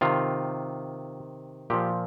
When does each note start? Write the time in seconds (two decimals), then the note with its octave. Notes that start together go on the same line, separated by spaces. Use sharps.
0.01 C3 D#3 F4
1.70 A#2 F3 G4